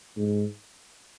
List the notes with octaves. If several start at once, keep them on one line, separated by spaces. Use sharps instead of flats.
G#2